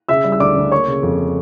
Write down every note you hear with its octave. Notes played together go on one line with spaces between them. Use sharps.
C#3 E5 E6
G3
E6
D2 D5 D6
D2
A#3 C#5 C#6
C#3
F2